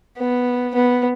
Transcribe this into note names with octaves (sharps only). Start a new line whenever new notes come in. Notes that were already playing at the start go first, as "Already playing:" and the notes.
B3
B3